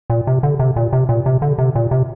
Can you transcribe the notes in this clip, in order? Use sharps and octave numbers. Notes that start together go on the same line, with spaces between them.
A#2
C3
D3
C3
A#2
C3
A#2
C3
D3
C3
A#2
C3